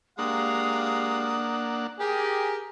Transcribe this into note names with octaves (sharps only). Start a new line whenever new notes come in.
G#3 A#3 D4 G4 F5 F#5 D#6
G4 G#4 A#4